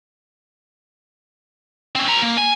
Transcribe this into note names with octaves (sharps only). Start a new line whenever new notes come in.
C4 C#4
B4 A#5
A#3
G#5